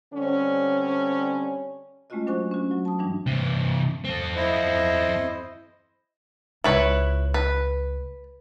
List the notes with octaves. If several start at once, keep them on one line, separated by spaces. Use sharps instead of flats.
D3 G3 C4 C#4
G#3 A3 C#4 F4 F#4 D#5
F#3 D4 C5 G#5 C#6 F#6
C#4 F#4
F#3
A5 D#6
G2 E3 G3 D4
C3 E3
C4 A4
E4 C5 D#5
C#2 E4 B4 C#5
B4